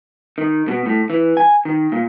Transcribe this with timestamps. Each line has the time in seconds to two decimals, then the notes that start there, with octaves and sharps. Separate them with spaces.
0.38 D#3
0.68 B2
0.86 A2
1.10 E3
1.37 G#5
1.65 D#3
1.92 A#2